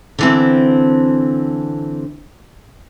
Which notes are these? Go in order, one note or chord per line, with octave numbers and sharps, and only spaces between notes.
D3 E3 C4